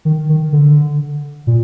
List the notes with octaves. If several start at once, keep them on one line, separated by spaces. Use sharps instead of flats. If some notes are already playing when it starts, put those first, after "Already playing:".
D#3
D#3
D3
A#2